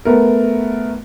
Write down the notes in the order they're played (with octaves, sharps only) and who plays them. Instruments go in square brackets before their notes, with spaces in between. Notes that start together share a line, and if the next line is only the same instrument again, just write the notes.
[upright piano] A3 B3 A#4